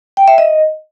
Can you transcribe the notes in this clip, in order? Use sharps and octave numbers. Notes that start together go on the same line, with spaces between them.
G5
E5
D#5